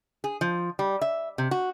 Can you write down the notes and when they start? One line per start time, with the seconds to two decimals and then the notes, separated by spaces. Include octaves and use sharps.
0.24 G#4
0.41 F3
0.79 G3
1.01 E5
1.38 C3
1.51 F#4